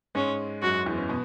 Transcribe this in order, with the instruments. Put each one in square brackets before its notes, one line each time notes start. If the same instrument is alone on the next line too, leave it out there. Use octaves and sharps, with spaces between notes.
[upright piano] G#2 G#3 [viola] C#4
[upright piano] F#2 F#3 [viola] F#4
[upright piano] E2 E3
C#4
B2 B3